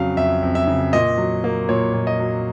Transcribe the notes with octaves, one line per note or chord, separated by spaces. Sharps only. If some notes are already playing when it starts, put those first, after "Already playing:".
Already playing: F2 C#3 F#3 F5
F2 E5
F2
E5
C#3
A#2 D#5
F#3
A#3
A#2 C#5
A#2
D#5
F#3